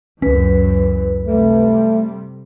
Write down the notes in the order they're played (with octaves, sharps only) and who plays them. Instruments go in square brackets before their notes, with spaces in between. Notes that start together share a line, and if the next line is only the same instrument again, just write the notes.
[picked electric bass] C#2 C#4 [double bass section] F#2 E3 [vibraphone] B4
[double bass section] C3 G3 [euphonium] A3